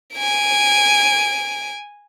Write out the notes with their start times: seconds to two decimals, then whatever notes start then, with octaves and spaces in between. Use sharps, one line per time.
0.15 G#5 D7